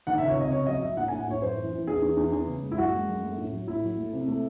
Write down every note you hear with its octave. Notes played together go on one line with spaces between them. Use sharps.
D#3 F#5
E5
C#2
C#5
C3 D#5
C#3 C#5
F#3 D#5
F#3 E5
A2 F#5
G#5
A2
F#5
A2 C#5
F#2 C5
E3
E3
E2 G#4
E2
E2
E2
C#3
G#3
E4
F#2 F#4
G#3
F#2
A3
A2
F#3
A2 E4
F#3
A3
C3
A3